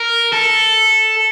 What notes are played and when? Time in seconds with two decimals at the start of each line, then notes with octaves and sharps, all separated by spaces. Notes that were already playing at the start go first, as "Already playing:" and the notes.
Already playing: A#4
0.33 A4